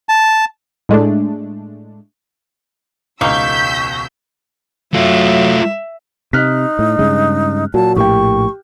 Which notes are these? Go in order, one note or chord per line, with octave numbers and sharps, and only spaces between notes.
A5
A2 G#3 A3 D4
E1 C#2 A#3 D#4 C#6 E6 G6 B6
F#3 A3 F4 E5
C3 D#4 F6 F#6 B6
A2
G2 C#3 G#3
A#2 F#3 A5
A#1 A2 A#3 G4 G5 C#6